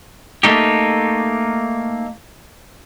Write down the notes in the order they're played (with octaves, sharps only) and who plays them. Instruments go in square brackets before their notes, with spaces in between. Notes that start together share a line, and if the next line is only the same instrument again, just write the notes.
[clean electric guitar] A3 A#3 D#4 G4